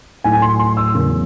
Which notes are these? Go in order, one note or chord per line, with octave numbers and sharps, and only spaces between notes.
A2 F#3 A3 G#5
C6
C6
E6
E2 C#3 F#3 A#3